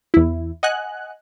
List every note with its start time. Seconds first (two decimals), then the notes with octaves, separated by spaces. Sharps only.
0.14 E2 E4
0.63 D#5 F#5 G#5 F#6